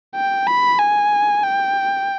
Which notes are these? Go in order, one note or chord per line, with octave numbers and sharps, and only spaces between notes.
G5
B5
G#5
G5